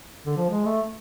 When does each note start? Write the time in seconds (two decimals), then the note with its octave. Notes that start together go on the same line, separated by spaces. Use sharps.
0.26 D3
0.37 F3
0.50 G#3
0.65 A3